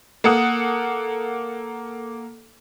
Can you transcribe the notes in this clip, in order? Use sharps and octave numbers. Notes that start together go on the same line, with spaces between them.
A#3 A4 F#5 D#6